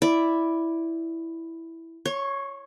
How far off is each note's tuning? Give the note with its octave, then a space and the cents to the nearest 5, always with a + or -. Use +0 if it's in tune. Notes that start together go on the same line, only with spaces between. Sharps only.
E4 +0 D5 +0
C#5 +0 C6 +45